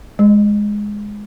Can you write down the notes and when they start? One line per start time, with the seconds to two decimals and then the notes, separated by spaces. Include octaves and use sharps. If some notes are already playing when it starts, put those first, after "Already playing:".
0.19 G#3